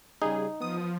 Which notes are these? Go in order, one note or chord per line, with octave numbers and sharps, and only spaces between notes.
C#3 G3 D#4 G#4
F3 B3 D#6